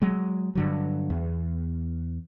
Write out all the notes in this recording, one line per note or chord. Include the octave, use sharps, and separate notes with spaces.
F#3 G#3
G2 D3 F#3
E2